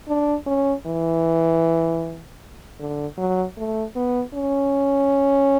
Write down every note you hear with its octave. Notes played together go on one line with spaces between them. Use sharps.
D4
C#4
E3
D3
F#3
A3
B3
C#4